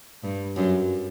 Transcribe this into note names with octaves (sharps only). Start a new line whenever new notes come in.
G2
F#2